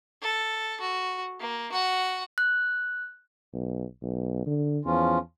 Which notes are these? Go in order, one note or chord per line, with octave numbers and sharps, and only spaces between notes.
A4
F#4
A#3
F#4 F#5
F#6
B1
B1
D3
E2 F3 C#4 F4